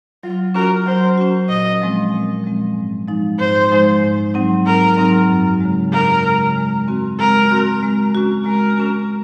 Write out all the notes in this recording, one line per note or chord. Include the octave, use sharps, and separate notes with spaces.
F#3 F4
C#4 F#4 A#4
F#3 C5
C#4 F#4
A#2 D#5
F3 G#3 C4
A#2
F3 G#3 C4
G#2
F3 G#3 D#4
G#2 C5
F3 G#3 D#4
G#2
F#3 C4 D#4
G#2 A#4
F#3 C4 D#4
F#2
C#3 G#3
F#2 A#4
C#3 G#3
G#3
C4 F#4
G#3 A#4
C4 F#4
G#3
C#4 F#4
G#3 A#4
C#4 F#4